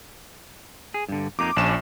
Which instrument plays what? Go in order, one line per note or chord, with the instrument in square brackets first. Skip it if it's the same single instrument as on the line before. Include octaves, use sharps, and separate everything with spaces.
[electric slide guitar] G#4
G2 D3
[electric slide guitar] F2 A#3 D#4 [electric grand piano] D6
[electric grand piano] A#1 E7 [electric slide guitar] C#4 D4